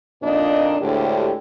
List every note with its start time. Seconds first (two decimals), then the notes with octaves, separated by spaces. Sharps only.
0.22 F2 A#2 A#3 D4 D#4 D#5
0.80 D2 A2 D3 G#3 G4